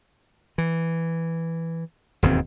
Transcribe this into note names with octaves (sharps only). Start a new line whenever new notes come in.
E3
E1 D#2 G#2 C4